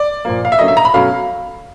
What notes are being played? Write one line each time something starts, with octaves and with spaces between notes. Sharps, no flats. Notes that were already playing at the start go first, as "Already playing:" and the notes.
Already playing: D5
A#2 F3 A#3
F5
E5
D3 F#3 A#3 C#4 D#5
E5
A#5
B5
B2 F#3 A3 C#4 F5